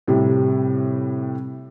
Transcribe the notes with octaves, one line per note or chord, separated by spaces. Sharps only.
A2 C3 G3